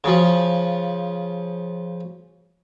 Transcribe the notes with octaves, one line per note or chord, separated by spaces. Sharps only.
C#3 F3